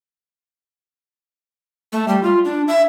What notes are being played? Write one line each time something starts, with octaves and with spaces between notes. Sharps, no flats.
A3
G3
F4
D4
E5